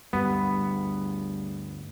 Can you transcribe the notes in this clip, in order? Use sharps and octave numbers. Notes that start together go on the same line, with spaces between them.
D2 G2 G3 B3